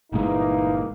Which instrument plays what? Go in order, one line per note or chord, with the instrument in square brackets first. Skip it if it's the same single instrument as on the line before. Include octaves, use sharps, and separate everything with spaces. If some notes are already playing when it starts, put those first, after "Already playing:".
[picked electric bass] G1 A#2 G#3 [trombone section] E3 A#3 D#4